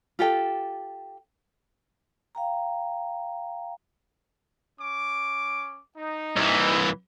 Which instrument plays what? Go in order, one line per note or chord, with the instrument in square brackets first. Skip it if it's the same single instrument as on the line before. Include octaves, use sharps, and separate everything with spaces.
[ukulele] F4 G4 A4 G5
[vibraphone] F5 G5 A#5
[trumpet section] C#4 D6
D#4
[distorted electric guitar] C2 E3